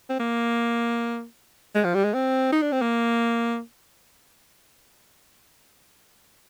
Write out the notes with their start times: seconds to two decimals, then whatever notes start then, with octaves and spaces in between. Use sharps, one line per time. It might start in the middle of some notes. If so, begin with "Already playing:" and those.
0.10 C4
0.20 A#3
1.75 G#3
1.85 F3
1.94 G3
2.04 G#3
2.14 C4
2.52 D#4
2.62 D4
2.72 C4
2.82 A#3